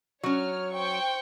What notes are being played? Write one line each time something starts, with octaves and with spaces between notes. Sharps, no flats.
F#3 C#4 C#5 F6
C5 G5 C#6